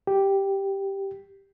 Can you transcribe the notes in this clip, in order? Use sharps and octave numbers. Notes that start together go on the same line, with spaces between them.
G4